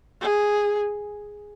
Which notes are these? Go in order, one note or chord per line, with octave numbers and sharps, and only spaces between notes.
G#4